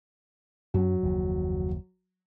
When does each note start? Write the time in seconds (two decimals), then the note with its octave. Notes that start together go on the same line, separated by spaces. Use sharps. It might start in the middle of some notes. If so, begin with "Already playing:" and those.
0.74 F#2 F#3 C4 C#4
1.03 F#1 D#2 F3